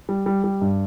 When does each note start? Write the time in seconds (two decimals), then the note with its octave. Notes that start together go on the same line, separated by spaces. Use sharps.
0.09 G3
0.26 G3
0.44 G3
0.62 G2